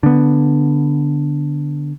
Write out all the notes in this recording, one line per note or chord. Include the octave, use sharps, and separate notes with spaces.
D3 B3